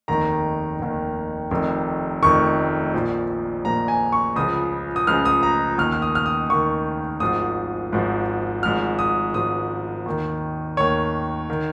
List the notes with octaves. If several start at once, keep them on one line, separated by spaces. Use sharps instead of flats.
F1 D#2 D#3 A#5
F1 D#2 D#3
F1 F2 D#3
F1 F2 D#3 C#6
A#1 A#2 F3
A#1 A#2 F3 A#5
G#5
C#6
C#2 C#3 F3 D#6
D#6
C#2 C#3 F3 F6
D#6
A#5
D#2 D#3 F6
F6
D#6
F6
D#6
D#2 D#3 C#6
G#1 G#2 F3 D#6
G#1 G#2 F3
G#1 G#2 F3 F6
D#6
G#1 G#2 F3 D#6
D#2 D#3
D#2 D#3 C#5
D#3